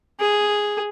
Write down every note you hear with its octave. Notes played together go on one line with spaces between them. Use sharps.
G#4